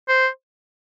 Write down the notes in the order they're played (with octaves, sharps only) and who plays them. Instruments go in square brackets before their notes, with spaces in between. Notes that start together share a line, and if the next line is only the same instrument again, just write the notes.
[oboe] C5